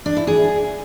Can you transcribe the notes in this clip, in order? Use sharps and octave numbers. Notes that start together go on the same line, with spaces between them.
D4
E4
G#4